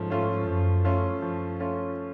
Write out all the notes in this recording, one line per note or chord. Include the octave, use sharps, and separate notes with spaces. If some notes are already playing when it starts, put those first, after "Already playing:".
Already playing: G#2 F3 A3 C#4
A3 C#4 F4
F#2 F3
A3 C#4 F4
F3
A3 C#4 F4